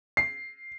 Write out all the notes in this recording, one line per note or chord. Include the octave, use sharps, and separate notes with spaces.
C7